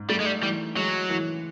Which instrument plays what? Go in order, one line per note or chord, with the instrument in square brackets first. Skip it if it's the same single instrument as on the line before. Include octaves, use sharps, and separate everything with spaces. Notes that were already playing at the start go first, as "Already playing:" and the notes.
Already playing: [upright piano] G#2
[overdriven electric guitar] G3 [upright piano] A3
[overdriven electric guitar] G#3
G3
[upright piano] E3 [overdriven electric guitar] G3
[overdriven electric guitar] F#3 [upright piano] G#3
[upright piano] E3